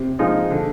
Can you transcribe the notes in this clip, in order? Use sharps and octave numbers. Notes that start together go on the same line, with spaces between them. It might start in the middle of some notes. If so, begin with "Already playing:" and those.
Already playing: C3
F3 G#3 D#4
D3